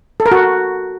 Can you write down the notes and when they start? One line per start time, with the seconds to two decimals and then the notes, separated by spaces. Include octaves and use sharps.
0.20 A4
0.26 A#4
0.32 F#4